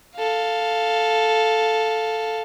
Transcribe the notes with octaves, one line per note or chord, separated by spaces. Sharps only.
A4 F5